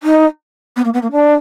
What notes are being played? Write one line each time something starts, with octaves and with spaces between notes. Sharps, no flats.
D#4
B3
A#3
B3
A#3
D4